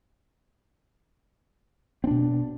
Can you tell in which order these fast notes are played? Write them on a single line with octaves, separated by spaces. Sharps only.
C4 D4 B2